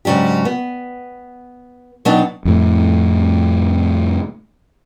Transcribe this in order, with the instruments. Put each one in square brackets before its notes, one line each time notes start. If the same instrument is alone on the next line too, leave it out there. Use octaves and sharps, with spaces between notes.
[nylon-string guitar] G#2 C#3 F#3 D4 G4
B3
B2 F#3 B3 C4 D4 D#4
[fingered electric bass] F2 A2